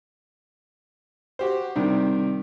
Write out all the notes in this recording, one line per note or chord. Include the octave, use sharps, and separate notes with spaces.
F#4 G4 C5
C3 D#3 G3